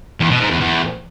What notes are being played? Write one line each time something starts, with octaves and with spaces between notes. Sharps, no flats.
E2
B2
G#2
E2
E2